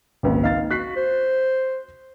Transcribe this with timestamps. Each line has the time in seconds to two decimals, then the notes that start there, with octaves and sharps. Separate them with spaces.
0.23 G#1 C#2 A#2
0.43 D#4 F5 A6
0.71 F#4 F#6 B6 C7
0.96 C5